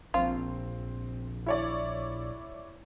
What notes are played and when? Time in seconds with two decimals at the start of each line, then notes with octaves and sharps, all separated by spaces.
0.14 A#1 C4 F4
1.46 E4 C#5 D5